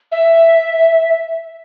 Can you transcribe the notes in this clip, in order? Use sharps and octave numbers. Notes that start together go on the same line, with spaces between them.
E5